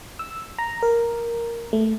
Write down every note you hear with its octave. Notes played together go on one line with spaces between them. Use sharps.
E6
A#5
A#4
A3